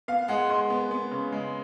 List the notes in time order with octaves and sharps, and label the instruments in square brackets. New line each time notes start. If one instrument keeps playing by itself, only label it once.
[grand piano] B3 [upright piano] F5
[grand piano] G#3 [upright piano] F#5
[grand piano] G#3 [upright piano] C6
[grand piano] B3
B3
C#3
G#3